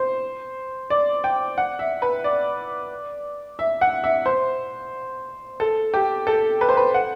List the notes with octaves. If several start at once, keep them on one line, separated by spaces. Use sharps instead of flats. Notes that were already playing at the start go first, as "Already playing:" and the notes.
Already playing: C5
D5
G5
F#5
E5
B4
D5
E5
F#5
E5
C5
A4
G4
A4
B4
C5
B4
F#5